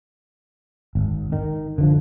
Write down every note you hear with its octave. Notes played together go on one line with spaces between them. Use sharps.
G#1
D#3
D3 E3 F3